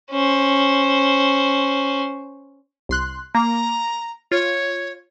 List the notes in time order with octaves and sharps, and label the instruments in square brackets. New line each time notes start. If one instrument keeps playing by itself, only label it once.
[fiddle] C#4 C5
[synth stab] C2 C6 F#6
[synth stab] A#3 [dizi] A#5
[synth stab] F4 [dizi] C#5